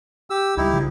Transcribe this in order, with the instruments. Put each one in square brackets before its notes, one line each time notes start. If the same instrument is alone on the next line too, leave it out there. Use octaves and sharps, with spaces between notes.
[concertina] G4 E6
[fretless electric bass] C#2 G3 [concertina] D#4 E4 G4
[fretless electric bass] C2 C#3 F3